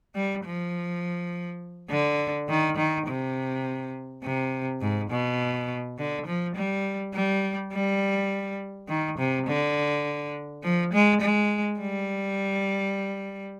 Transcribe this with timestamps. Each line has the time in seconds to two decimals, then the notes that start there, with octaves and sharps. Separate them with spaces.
0.15 G3
0.45 F3
1.90 D3
2.49 D#3
2.77 D#3
3.07 C3
4.24 C3
4.81 G#2
5.10 B2
5.98 D3
6.26 F3
6.56 G3
7.14 G3
7.72 G3
8.88 D#3
9.18 C3
9.47 D3
10.63 F3
10.93 G#3
11.21 G#3
11.80 G3